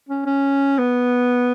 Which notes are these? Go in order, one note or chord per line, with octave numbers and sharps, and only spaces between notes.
C#4
C#4
B3